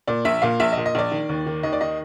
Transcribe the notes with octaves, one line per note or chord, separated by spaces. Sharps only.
A#2 D5
A#1 E5
A#2 F5
A#1 E5
D#5
A#2
D#5
A#1 D5
D#3
D#2
D#3
D#2 D#5
D5
D#3 D#5